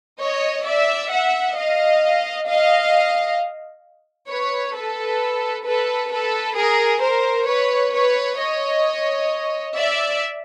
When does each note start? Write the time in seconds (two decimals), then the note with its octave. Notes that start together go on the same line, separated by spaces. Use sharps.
0.20 C#5 D#5
0.67 D5 E5
1.12 E5 F#5
1.57 D#5 F5
2.48 D#5 F5
4.29 B4 C#5
4.75 A4 B4
5.65 A4 B4
6.11 A4 B4
6.57 G#4 A#4
7.02 A#4 C5
7.48 B4 C#5
7.93 B4 C#5
8.38 C#5 D#5
9.75 D5 E5